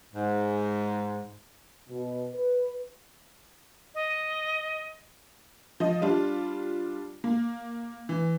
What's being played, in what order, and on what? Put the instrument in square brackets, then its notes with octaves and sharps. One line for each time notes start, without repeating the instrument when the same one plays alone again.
[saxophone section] G#2
[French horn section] B2
B4
[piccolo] D#5
[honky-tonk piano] F3 D#5
G3 D4 F4
A#3
E3